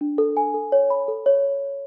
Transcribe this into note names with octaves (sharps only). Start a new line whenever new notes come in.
D4
A4
G#5
A4
C#5
B5
A4
C#5